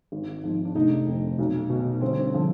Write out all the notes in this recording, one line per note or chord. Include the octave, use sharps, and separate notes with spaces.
G#1
G#2 F3
D4
F1 D#4
F2 D#3
B1
B2
G1 C4
D3 F3